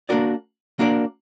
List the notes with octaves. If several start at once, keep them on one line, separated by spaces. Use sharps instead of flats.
A#3 D4 F#4 A#4 D5
A#3 D4 F#4 A#4 D5